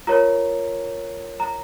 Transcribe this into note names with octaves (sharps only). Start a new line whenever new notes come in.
F4 A#4 C#5 A#5
A#5